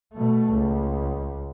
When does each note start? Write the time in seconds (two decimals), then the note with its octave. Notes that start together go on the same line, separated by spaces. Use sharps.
0.14 B2 A3
0.52 C#2